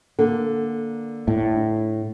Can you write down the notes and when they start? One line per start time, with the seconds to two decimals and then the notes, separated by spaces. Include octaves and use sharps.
0.19 D3 A#3
1.28 A2